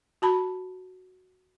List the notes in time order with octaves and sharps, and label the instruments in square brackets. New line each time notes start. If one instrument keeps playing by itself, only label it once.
[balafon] F#4 A5 B5